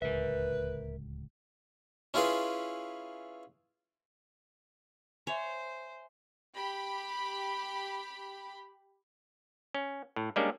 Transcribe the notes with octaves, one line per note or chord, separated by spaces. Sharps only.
D1 C#2 A#4 B4 E5
C#4 E4 F4 G#4 B4
C5 C#5 E5 G#5
G4 B5
C#4
A2
G3 G#3 A#3 C#4 D4